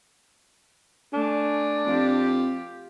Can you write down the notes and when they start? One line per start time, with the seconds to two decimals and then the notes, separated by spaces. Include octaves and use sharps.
1.13 A3 D4 G#5
1.87 F2 F4 G4